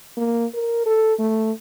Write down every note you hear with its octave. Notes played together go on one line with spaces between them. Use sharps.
A#3
A#4
A4
A3